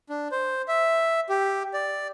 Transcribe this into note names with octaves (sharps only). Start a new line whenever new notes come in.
D4
C5
E5
G4
D5